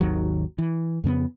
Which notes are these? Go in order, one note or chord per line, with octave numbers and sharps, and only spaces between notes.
G#1 D#2 D#3 F#3
E3
F2 C#3 A#3 B3